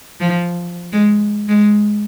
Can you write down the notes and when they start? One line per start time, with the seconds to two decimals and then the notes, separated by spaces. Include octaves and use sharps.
0.21 F3
0.93 G#3
1.49 G#3